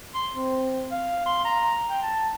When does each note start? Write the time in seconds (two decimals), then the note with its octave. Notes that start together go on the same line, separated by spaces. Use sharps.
0.14 C6
0.35 C4
0.91 F5
1.26 C6
1.45 A#5
1.90 G5
2.02 A5